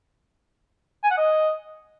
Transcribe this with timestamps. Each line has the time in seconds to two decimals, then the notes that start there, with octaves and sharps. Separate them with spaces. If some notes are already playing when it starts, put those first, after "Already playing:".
1.04 G#5
1.11 F#5
1.18 D#5